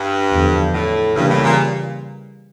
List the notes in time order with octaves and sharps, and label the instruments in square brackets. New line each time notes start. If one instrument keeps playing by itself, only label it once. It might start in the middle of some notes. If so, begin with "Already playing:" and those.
Already playing: [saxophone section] G2
[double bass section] E2 D3 F3
[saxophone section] A2
[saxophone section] G2 [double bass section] C#3 E3 G3 A#3
[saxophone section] A2
A#2